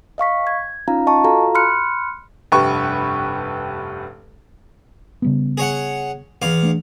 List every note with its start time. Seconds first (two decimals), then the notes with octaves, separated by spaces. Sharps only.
0.18 D#5 F5 C#6 B6
0.47 G#6
0.88 C#4 D#4 F4 F5 A#5
1.07 D#5 A5 C#6
1.24 F4 F#4 A4 F5 A#5
1.55 B5 C6 F6 F#6 C#7
2.52 F1 G2 G4 B4 E5 C#6
5.22 C#3 G3 B3
5.58 G#4 C#5 F#5
6.42 E2 F5 D6
6.63 A3 D4